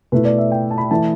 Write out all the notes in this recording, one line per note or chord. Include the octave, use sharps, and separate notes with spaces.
B2 A3 E4 B4
D5
E5
G5
A5
B5
E3 A3 E4 A5